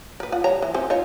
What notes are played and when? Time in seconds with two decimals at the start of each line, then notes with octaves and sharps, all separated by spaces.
0.20 A#4 B4
0.32 F4 F#5
0.44 G3 C#5 A#5
0.62 E3
0.74 C4 C#4 C5
0.90 D#4 F4 C#5